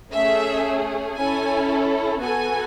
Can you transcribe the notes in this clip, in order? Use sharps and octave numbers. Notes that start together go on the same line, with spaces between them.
A3 C#4 G#4 E5
C#4 E4 A4 G#5
B3 F#4 A4 G#5